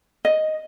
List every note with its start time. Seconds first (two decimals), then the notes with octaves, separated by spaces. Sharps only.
0.25 D#5